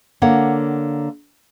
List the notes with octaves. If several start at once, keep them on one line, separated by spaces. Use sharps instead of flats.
D3 A#3 C#5 F#5